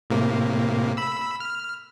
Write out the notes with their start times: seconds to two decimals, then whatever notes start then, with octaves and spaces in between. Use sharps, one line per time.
0.10 A2 C3 A#3
0.97 B5 E6
1.40 F6